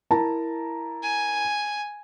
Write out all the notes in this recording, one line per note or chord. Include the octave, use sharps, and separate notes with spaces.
E4 A#4 A5 A#5
G#5